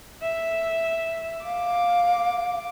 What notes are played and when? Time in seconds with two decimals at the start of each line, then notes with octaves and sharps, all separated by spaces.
0.22 E5
1.45 F5 D6